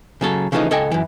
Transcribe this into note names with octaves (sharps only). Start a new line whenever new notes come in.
C#3 F#3 A4
C#3 E3 F3 A3 C#4 D#4
C#2 A4 D#5 G5 G#5
F#2 E3